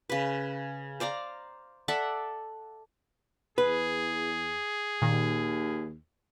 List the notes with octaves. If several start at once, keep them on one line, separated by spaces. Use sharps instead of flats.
C#3 B4
C5 D5 F5 A#5
A4 D5 E5 F#5
E2 G#4 B4
D#2 A#2 D#3